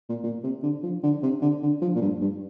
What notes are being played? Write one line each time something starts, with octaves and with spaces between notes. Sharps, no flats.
A#2
A#2
C3
D3
F3
D3
C3
D3
D3
F3
A#2
G2
G2